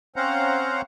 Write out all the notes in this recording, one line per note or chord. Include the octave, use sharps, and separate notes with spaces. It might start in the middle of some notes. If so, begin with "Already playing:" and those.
C4 C#4 C5 F5 F#5 A#5